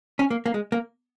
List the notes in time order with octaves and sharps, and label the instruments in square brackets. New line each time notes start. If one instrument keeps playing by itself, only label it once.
[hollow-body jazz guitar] C#4
A#3
A#3
G#3
A#3